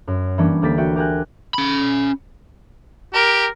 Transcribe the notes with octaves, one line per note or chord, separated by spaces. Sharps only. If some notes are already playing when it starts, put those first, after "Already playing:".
F#2
E3 G3 A#3 C#4 D4
D2 A#3 G4 A6 B6
F#4 E5 G5
G4 A#4 G5 G#5 F#6
C#4 B5
G4 A#4